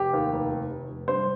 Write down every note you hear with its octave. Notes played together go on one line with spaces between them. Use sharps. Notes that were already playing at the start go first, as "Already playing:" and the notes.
Already playing: F1 G4
D#2
F1
F1
F1
F1
G2 C5